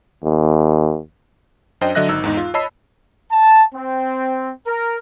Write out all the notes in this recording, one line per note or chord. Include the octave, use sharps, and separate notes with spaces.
D#2
F#2 D4 C5 D#5 G5
D3 F#3 D#5 E5 F#6 A#6
G#1 D#4 E6
E2 G#2 D#4
F4
C#5 D#5 A5 B5 E6 C7
A5
C4
A#4